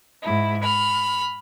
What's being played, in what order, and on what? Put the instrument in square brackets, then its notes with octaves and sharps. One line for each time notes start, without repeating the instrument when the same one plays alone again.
[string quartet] G#2 E4
[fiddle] B5 [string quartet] F6